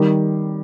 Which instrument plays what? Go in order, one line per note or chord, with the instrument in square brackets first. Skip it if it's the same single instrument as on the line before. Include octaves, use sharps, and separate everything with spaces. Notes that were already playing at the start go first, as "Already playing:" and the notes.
Already playing: [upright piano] D#3 G3